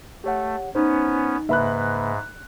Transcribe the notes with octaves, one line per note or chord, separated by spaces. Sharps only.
A3 G4 C#5 F#5
B3 C#4 D#4 C5
G#2 C#3 A#3 B4 E5 B5 F#6